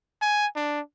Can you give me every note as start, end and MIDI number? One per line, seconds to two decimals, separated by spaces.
0.22 0.47 80
0.56 0.81 62